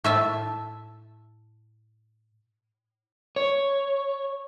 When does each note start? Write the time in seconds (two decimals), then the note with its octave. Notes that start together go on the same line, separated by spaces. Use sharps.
0.04 A2 E5 A5
3.36 C#5